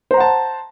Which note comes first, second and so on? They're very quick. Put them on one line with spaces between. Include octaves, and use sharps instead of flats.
C5 A#5 F#5 A5